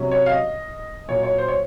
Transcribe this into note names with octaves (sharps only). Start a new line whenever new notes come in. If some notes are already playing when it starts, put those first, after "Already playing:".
Already playing: C3 F#3 C#4
C#5
F5
D#5
A#2 F#3 C#4 C#5
C#5
C5
C#5